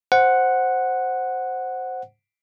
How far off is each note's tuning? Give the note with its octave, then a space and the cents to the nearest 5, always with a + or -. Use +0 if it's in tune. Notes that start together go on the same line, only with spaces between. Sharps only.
C5 +0 F#5 +0